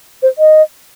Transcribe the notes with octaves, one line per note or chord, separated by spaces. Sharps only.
C5
D#5